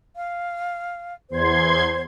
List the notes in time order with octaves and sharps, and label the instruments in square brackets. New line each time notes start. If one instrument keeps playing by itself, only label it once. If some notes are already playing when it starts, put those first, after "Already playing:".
[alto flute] F5
[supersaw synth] E2 C6 G#6 [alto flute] C5